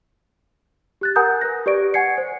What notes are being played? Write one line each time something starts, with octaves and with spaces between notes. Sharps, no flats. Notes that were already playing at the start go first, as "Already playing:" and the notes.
G4 F#6 A6
A#4 F#5 G#5 A#5 D#6 G6
A#4 B4 F#6 A#6
G4 B4 D5 C#6 D7
F#5 G#5 G#6 C7 C#7
C5